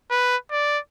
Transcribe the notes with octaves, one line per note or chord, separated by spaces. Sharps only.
B4
D5